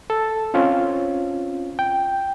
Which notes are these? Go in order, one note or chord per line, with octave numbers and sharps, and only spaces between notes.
A4
C4 C#4 F4
G5